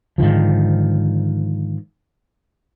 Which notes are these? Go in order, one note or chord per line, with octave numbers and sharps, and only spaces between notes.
G#2 D3 D#3 F3